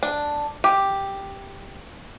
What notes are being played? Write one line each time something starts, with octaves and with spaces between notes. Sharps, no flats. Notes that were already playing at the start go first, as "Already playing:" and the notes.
D4
G4